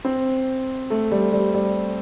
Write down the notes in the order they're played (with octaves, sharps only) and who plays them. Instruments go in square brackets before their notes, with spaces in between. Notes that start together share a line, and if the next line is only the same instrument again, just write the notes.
[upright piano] C4
A3
G3
G3
G3